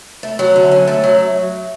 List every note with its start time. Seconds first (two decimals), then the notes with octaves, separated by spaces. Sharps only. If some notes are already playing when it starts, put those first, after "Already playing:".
0.23 A3
0.39 F#3
0.56 D3
0.71 C#4
0.87 A3
1.04 F#3